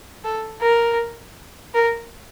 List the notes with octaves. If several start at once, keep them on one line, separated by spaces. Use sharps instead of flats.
A4
A#4
A#4